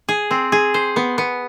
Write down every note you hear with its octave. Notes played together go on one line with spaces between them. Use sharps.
G#4
C4
G#4
C5
B3
B3